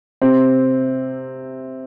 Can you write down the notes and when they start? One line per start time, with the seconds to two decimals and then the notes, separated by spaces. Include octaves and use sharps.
0.22 C3 C4